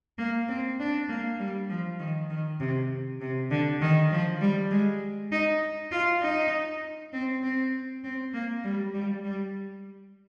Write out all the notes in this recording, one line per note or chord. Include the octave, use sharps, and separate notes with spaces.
A#3
C4
D4
A#3
G3
F3
D#3
D#3
C3
C3
D3
D#3
F3
G3
G#3
D#4
F4
D#4
C4
C4
C4
A#3
G3
G3
G3